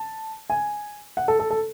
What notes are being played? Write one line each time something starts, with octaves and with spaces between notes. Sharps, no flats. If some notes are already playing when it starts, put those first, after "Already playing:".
Already playing: A5
G#5
F#5
A4
A4
A4